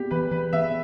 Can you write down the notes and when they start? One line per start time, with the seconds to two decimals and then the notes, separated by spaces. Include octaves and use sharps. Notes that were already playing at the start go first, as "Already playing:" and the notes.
Already playing: B3 G4
0.11 E3 B4
0.31 E3 B4
0.53 B3 E5